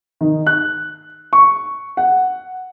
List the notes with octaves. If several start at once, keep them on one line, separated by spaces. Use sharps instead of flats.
D#3
F#6
C#6
F#5